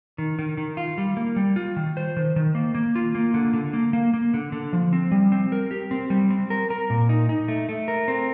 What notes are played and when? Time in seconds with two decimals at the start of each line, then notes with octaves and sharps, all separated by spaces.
0.18 D#3
0.39 D#3
0.57 D#3
0.77 F4
0.98 G3
1.17 A#3
1.36 G3
1.56 F4
1.77 D#3
1.97 C5
2.17 D#3
2.36 D#3
2.55 A#3
2.75 A#3
2.95 F4
3.15 A#3
3.34 D3
3.54 D3
3.73 A#3
3.93 A#3
4.14 A#3
4.34 D3
4.52 D3
4.73 F3
4.93 C4
5.12 G3
5.32 C4
5.52 A#4
5.71 G4
5.91 C4
6.10 G3
6.30 C4
6.50 A#4
6.70 A#4
6.90 A#2
7.09 D#4
7.29 D#4
7.48 A3
7.69 A3
7.88 A#4
8.08 C4